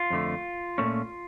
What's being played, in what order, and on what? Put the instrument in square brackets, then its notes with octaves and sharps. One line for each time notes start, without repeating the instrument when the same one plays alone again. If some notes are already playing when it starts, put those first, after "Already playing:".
Already playing: [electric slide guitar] F4
F2 D3 A3
A#2 A3 C#4